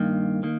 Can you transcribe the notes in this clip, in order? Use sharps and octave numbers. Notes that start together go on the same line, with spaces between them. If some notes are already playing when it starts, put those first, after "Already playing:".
Already playing: G2 D#3 A#3
D#3 A#3